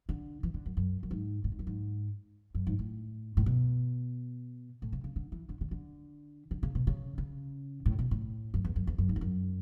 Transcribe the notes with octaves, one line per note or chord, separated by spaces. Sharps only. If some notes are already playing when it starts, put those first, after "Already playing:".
D3
E3
D3
F#2
F#2
F#2
G#2
A2
G#2
F#2
G#2
F#2
G#2
A2
A2
B2
A2
C#3
C#3
D3
E3
D3
D3
D3
D3
C#3
B2
C#3
C#3
A2
B2
A2
F#2
E2
F#2
E2
F#2
G#2
E2
F#2